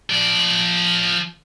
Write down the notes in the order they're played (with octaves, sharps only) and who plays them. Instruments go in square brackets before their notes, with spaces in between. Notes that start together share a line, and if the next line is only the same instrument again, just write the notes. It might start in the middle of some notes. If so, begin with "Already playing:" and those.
[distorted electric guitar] F3 D5